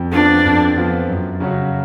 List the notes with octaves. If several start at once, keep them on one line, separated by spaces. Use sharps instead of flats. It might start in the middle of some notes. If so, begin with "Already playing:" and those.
Already playing: F2
F3 B3 D4 F4
F2
F3 B3 F4
F#2
C#3 F#3 C#4 F#4